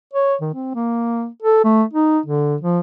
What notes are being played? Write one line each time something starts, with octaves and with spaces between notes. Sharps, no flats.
C#5
D#3
C4
A#3
A4
A3
D#4
D3
F3